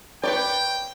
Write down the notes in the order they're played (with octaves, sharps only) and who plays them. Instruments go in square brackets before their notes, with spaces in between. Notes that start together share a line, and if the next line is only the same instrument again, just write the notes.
[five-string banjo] B4 C#5 D5 [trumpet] G5